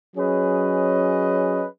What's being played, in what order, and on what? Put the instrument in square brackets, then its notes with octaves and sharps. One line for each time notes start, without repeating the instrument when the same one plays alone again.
[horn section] F#3 C#4 G#4 B4 D#5